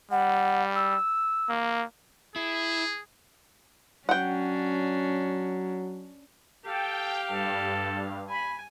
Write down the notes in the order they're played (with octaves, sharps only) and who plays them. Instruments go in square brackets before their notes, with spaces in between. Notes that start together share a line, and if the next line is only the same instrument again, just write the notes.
[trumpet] G3 [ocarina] F#5
[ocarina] E6
[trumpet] A#3
[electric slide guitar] E4 [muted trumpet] G#4
[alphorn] F#3 [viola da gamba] C#4 D4 [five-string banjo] F#5 G5
[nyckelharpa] G4 F5 [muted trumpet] A4 [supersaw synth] G5
[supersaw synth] G2 [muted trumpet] A4
[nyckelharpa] G#5 [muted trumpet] B5